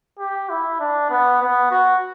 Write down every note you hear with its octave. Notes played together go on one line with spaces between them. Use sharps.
G4
E4
D4
B3
B3
F#4